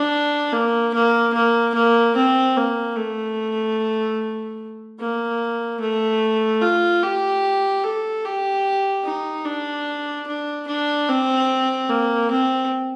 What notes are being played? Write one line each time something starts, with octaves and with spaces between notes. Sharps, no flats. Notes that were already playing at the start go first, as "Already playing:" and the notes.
Already playing: D4
A#3
A#3
A#3
A#3
C4
A#3
A3
A#3
A3
F4
G4
A4
G4
D#4
D4
D4
D4
C4
A#3
C4